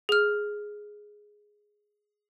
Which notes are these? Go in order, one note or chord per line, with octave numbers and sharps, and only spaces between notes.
G#4 F6